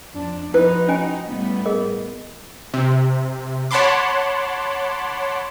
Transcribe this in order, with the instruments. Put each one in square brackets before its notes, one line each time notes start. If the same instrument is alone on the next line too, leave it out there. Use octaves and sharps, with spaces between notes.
[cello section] F2 D4
[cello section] F3 D#4 F#4 [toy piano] E4 [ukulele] B4
[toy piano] C#4 D#5 G#5
[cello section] A2 G3 B3
[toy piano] G#4 A#4 D#5
[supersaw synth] C3
C#5 F#5 A5 B5 C6 D6